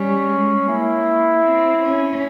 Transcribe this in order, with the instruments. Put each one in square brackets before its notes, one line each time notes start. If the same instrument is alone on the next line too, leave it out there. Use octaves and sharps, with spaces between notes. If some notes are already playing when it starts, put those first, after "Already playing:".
Already playing: [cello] G3 [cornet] C#4
[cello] G#3
[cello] A#3 [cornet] E4
[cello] C4
C#4